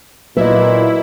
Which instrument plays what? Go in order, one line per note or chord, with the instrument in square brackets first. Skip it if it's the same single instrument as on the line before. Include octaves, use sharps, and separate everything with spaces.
[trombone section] A#2 [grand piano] F#3 [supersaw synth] E4 [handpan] B4 D#5